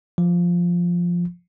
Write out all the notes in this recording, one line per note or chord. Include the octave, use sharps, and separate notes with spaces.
F3